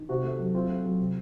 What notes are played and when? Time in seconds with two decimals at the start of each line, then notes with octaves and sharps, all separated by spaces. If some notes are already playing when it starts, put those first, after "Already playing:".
Already playing: D#3
0.09 C3 F#4
0.24 A3
0.39 F#3
0.54 C4 F4
0.69 A3
0.84 F#3
0.99 C3